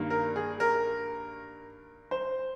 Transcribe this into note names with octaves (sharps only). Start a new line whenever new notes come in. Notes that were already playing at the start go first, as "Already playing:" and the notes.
Already playing: G2 D#3 A#3
A#4
G#4
A#4
C5